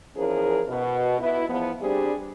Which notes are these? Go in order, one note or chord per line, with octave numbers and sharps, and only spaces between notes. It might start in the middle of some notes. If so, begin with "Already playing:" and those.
E2 F3 C#4 G#4 A#4
B2
B3 E4
E2 F3 B3
G3 C4 D4 G4 G#4